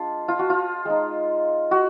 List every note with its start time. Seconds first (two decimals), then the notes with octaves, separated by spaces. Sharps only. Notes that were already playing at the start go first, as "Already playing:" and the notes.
Already playing: G#3 D4 F4
0.28 F4
0.39 F#4
0.50 F4
0.85 G#3 D#4
1.71 F#4